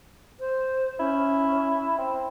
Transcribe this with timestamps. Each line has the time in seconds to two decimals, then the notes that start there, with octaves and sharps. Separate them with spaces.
0.40 C5
0.99 C#4 E4
1.98 C4